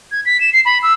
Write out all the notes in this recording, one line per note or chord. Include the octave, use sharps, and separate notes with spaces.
G#6
B6
E7
C7
B5
E6